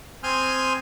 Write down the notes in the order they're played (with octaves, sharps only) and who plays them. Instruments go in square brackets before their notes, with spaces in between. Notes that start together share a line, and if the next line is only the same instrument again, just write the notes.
[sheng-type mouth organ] C4 G#5 C6 D#6 F6 G6